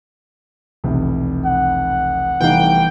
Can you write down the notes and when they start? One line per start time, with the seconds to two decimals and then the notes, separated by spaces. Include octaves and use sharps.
0.84 F1 B1 E2 C3
1.46 F#5
2.40 F1 E3 G3 B3 D#4 F5 G5